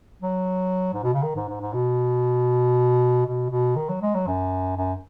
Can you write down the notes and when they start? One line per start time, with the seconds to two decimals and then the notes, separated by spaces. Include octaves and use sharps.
0.22 F#3
0.94 G#2
1.03 B2
1.14 C#3
1.23 D#3
1.36 G#2
1.49 G#2
1.61 G#2
1.73 B2
3.26 B2
3.50 B2
3.76 D#3
3.89 F#3
4.02 G#3
4.15 F#3
4.27 F#2
4.77 F#2